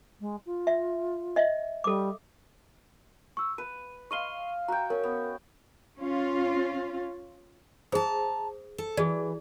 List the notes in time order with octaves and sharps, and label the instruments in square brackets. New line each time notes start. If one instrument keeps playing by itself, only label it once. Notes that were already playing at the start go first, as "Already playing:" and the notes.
[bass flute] G#3
F4
[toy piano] E5
D#5 E5
[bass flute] G3 [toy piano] A4 D6
[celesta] C#6 E6
[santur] B4 [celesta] D#7
[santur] D#5 F5 C6 [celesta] C#6 D#7 G7
[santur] F#4 G5 [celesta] A#5
[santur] C#4 [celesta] A#4
[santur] B3
[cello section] C#4 F4
[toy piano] G#4 C5 D#6 [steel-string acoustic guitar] A5 A#5
[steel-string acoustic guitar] A4
[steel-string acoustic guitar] E3 [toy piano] F#4 G#4 D5